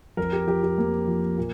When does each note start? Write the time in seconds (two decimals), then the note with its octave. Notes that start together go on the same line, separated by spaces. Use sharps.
0.17 F2 A#4
0.33 G4
0.47 F3 G4
0.63 G4
0.78 F2 A#3
1.07 F3
1.38 A#2